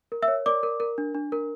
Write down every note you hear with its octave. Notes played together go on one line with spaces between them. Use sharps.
A#4
E5 E6
C#5
A#4 D5 D6
A#4
A#4
D4
D4
A#4